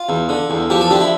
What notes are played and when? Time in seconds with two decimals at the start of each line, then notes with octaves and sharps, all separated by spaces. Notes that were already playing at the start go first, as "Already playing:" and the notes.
Already playing: F4
0.09 E2
0.29 D3
0.50 E2
0.70 F3 G4
0.81 A4
0.90 D3 G4
1.01 E4